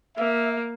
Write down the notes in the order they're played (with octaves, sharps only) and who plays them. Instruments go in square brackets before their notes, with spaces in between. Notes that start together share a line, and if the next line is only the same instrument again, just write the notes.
[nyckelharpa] A#3 [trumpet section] E5